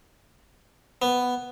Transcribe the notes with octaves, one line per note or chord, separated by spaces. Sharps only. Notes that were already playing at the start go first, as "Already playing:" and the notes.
B3